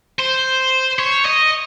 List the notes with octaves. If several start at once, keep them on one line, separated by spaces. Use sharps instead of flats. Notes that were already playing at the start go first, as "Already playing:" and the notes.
C5
C#5
D#5